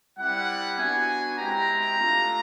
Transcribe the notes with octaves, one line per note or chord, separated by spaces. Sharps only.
G3 C4 E4 F#5
B3 D4 F#4 G#5
G#3 C4 E4 G4 A#5
A3 D4 F4